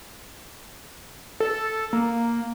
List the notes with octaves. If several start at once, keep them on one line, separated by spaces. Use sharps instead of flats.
A4
A#3